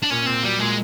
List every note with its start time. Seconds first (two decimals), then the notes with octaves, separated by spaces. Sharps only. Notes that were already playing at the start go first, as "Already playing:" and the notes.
0.03 D4
0.10 A#2 C#4
0.26 A#2 C4
0.43 F#3 G3
0.59 A#2 G#3